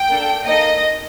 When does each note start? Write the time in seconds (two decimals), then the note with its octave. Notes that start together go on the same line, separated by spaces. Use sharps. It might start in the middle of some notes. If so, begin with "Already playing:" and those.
Already playing: G5
0.09 A#3 D4 A4
0.47 A#3 D#4 A4 D#5